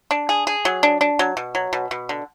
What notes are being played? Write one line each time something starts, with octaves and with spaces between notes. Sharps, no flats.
D4
G#4
G#4
F#3
D4
D4
F#3
B2
F#3
B2
B2
D3